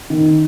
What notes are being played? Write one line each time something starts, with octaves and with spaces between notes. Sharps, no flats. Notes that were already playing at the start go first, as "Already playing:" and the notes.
D#3